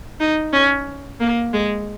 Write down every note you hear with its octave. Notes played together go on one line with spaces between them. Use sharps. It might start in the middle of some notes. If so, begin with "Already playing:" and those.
D#4
C#4
A#3
G#3